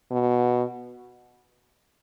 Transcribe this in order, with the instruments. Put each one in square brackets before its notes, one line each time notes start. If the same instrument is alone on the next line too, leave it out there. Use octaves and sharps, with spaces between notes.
[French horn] B2